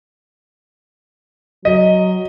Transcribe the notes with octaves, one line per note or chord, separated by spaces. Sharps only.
F#3 D#5